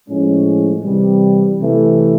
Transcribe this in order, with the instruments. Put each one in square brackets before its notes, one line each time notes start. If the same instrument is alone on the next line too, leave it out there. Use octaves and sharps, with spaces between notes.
[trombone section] A2 F3 G#3 C#4
C3 E3 G3
C3 E3 A3